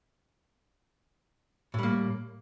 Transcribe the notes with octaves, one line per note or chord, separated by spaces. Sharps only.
A2 G3 A#3